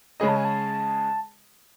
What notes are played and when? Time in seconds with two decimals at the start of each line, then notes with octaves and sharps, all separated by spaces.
0.20 C#3 G#3 C#4 G#4 D#5 B5
0.29 A5
0.37 G#5
0.45 A5